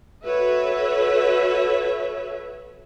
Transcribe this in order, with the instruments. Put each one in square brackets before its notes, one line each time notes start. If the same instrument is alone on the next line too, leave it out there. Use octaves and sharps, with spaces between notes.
[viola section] F#4 A4 B4 C#5 E5